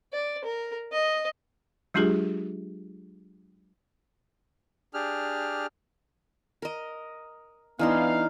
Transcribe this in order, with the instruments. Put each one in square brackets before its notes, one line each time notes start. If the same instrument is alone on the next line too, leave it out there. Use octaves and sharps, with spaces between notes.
[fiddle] D5
A#4
D#5
[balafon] F#3 G#3 D4 F4 G4 G#4
[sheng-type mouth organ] D4 G4 G#4 F6
[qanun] A#4 D#5
[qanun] E3 D4 C6 [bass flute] B3 [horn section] D#4 F5